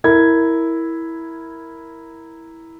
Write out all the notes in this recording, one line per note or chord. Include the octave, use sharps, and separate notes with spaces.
E4 A#4 G#6